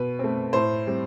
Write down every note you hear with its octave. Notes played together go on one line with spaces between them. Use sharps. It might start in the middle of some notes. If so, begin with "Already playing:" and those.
Already playing: B2 B4
A3 C4
A2 C5
G3 C4